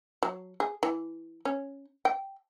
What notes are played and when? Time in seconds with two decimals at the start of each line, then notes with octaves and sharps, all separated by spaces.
0.23 F#3
0.60 G#4
0.83 E3
1.45 C#4
2.05 G5